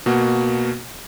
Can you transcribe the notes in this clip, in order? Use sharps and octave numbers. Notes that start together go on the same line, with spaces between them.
B2 A#3 F#4